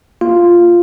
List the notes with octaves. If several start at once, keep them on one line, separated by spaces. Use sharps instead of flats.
A#3 F4